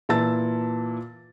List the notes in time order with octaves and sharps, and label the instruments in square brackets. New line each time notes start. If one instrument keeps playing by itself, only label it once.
[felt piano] A#2 E3 A5 E6 A6